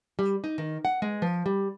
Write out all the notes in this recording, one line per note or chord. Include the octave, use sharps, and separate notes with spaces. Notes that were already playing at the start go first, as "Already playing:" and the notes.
G3
D#4
D#3
F#5
G#3
F3
G3